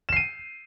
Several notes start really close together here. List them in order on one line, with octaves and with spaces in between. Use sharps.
E7 C7 D#7